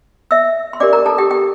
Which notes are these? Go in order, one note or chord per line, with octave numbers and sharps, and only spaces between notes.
E5 E6
C6
D4 G4 A#4 D5 D6
A#4 A#5
A4 A5
G4 G5
G4 G5